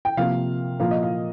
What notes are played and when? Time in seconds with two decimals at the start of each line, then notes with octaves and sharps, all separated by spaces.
0.05 G5
0.17 C3 F3 A#3 F5
0.80 A#2 F3 A#3 F5
0.91 D#5
1.03 F5